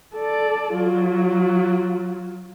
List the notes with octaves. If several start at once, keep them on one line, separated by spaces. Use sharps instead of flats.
A4 D5
F#3 F4